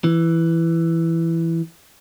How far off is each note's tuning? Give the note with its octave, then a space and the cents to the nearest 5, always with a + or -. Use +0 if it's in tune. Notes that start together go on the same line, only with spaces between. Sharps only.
E3 +5